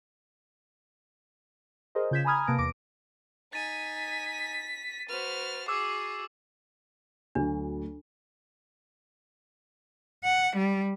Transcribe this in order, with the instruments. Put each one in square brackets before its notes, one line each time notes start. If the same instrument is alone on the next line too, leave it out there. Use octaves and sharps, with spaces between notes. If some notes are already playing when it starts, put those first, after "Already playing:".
[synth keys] G#4 A#4 C5 D#5
C#3 F4 G6 G#6 B6 E7
G#5 A#5 B5 D#6 F6 G#6
C3 A#3 B4 A5 A#6 D7
E2 D6 A#6 D7
[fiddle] D#4 G#5 [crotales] A6 D#7 [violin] B6
[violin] F#4 B4 [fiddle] C5 F6
[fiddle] F#4 G#4 [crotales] D6 E6 [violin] C7
[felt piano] D2 F#3 [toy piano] D4
[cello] F#5
G3